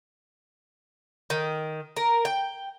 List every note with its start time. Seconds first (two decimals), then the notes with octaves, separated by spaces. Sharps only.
1.30 D#3
1.96 A#4
2.25 G5